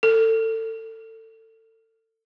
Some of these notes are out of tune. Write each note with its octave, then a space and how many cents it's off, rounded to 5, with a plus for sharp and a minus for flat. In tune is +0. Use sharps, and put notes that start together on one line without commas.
A4 +25